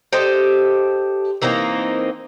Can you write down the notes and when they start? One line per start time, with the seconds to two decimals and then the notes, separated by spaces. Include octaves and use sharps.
0.13 G4 A4 C5 D#5
1.42 E3 A#3 C4 D#4